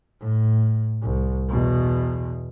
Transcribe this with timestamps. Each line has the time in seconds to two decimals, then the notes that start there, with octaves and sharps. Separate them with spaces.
0.20 A2
1.02 C2
1.49 E2 B2